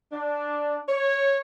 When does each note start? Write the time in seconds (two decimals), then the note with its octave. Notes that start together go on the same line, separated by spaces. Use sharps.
0.12 D4
0.89 C#5